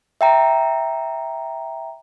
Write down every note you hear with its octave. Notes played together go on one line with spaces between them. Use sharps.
E5 G5 A#5